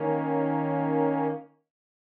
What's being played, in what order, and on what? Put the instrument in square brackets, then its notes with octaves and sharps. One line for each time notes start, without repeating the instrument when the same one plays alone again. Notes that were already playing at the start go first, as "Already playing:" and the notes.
Already playing: [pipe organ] D#3 A#3 C#4